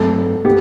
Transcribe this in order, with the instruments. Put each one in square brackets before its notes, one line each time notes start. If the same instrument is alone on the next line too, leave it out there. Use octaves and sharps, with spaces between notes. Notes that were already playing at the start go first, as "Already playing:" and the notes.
Already playing: [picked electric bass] G2 F#3 A3 C4 [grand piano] A4
[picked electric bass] B3 [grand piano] G4